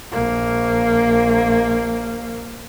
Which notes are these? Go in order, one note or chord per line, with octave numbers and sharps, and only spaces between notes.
A#1 A#3